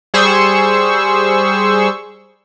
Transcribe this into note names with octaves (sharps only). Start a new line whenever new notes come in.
G3 G#4 C5 C#6 E6